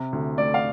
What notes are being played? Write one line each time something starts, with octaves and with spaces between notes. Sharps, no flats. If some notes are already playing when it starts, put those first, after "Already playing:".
Already playing: C3
D2
A3 D5
F5